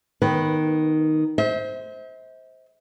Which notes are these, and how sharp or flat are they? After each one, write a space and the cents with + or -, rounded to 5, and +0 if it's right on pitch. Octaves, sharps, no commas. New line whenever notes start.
D#3 +0 B3 -20 B4 +0
C5 +0 E5 -45